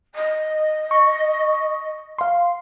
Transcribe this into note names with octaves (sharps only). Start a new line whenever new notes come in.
D#5
C#6
F5 C6